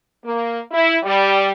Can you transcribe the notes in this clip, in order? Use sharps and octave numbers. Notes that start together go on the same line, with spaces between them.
A#3
E4
G3